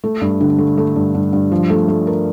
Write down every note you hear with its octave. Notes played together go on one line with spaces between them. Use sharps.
A3
G2
D3
A3
A3
G2
G2
G2
F3
A3
A3
A#4